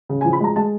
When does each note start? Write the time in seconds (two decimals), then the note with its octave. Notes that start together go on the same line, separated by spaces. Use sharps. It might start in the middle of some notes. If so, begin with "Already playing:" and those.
0.09 C#3
0.21 G#5
0.25 F3
0.33 B5
0.40 G#3 A#5
0.56 G#3 A5